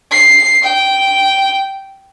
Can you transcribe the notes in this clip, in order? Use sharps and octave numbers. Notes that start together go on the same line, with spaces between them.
C7
G5